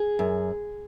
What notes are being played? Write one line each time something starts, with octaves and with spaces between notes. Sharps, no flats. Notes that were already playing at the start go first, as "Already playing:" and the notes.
Already playing: G#4
F#2